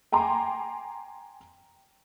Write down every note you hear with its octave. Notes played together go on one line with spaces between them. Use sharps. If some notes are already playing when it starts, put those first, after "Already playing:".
G5 G#5 A#5 C6 D6